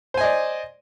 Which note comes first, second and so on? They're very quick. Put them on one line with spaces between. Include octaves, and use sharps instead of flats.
C5 G#5 D#5 D5